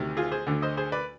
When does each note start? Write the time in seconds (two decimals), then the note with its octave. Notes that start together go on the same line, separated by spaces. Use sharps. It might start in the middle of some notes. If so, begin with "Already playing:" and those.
Already playing: D2 C3 D#3
0.17 F4 G#4
0.32 G#4 C5
0.47 D2 D3
0.62 C5 D#5
0.77 G#4 C5
0.92 B4 D5